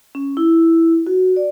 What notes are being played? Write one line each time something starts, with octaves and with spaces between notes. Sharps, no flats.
C#4
E4
F#4
D5